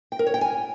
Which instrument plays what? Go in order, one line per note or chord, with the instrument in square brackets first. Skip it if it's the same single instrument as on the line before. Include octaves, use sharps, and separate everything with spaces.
[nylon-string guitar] G5
A#4
C#5
G5
G#5